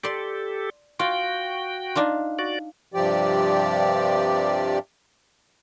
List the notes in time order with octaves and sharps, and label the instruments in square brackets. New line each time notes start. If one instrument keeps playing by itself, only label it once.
[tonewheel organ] G4 A4 [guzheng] D5 C6
[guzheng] F4 [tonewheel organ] F#4 G5
[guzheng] D4 D#4 F4
[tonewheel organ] F#4 D5
[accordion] G2 C3 F3 G4 D5